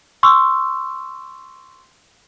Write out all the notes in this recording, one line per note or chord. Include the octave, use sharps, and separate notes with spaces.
C6 C#6 E6